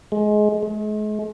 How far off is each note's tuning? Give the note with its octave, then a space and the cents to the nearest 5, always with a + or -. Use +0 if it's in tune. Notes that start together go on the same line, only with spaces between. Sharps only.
G#3 +20
G#3 +40